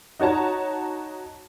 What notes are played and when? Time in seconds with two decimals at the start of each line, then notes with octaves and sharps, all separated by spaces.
0.20 D#4 F#4 C#5 A5 A#5